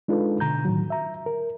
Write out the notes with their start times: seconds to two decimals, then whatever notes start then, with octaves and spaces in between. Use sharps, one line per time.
0.08 G#3 D4 D#4 F4 A4 B4
0.40 B2 D3 A#5 G6
0.65 A2 D#3 F#3
0.90 E5 A#5
1.26 A#4